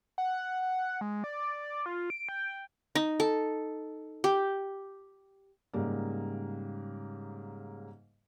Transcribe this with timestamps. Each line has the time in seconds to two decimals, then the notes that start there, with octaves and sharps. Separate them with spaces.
0.18 F#5
0.62 F#5
1.01 G#3
1.24 D5
1.86 F4
2.10 D7
2.29 G5
2.95 D#4
3.20 A4
4.24 G4
5.74 G#2 C#3 G3 A#3